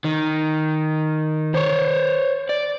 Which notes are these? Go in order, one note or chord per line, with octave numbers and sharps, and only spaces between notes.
D#3
C5 C#5
D5